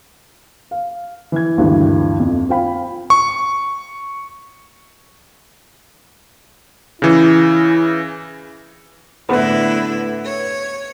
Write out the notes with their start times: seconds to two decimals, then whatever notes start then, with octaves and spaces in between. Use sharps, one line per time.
0.71 F5
1.32 E3 G#6
1.57 D2 G2 A#2 D#3 E3
2.20 F2
2.49 C4 F4 F5 G5 B5
3.10 C#6
7.02 C#3 E3 E4
9.29 A2 D3 B3 E4 B4
10.23 C#5